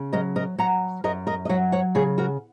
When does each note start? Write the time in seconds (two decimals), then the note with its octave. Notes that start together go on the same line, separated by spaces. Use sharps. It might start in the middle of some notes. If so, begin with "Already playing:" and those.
Already playing: C#3
0.13 F#3 A#4 D#5
0.36 A#4 D#5
0.58 F#3 F#5 A#5
1.04 F#2 A#4 D#5
1.27 A#4 D#5
1.45 D#5
1.49 F#3 C#5 F#5
1.72 C#5 F#5
1.95 C#3 G#4 C#5
2.18 F#4 A#4